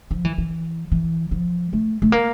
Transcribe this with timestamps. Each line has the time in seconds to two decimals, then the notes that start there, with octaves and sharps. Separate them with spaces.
0.11 F3
0.25 E3
0.38 E3
0.92 E3
1.31 F3
1.73 A3
2.02 A3
2.12 A#3